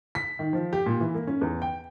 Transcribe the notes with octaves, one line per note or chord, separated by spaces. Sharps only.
B6
D#3
F3
G4
A#2
E3
A#3
C#4
E2
G5